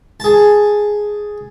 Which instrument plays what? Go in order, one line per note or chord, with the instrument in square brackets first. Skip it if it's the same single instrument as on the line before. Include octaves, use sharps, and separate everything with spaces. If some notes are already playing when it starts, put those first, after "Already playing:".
[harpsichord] G#4 A5